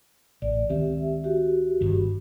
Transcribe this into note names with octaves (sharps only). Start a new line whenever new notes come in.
A1 D5
C#2 D#3 C4 G4 E5
F#4 G4
G1 G2 D#3